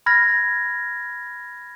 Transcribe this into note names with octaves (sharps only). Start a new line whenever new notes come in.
B5 F6 G#6 A#6